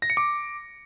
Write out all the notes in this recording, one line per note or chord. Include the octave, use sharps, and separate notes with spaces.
A#6
C#7
D6